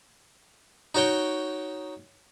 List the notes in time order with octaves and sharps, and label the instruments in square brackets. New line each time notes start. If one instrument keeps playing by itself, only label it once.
[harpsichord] D#4 F#4 C#5 G5